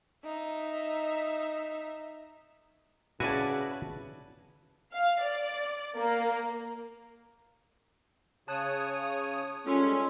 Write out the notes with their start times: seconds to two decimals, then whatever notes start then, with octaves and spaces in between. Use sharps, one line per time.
0.24 D#4 E5
3.20 C#3 E4 F#4 B4 D5 G#5 A5
4.92 F5
5.21 D5
5.95 A#3
8.48 C#3 C#5 A5 D#6 F#6
9.66 G3 G#3 C#4 F4 A4 C6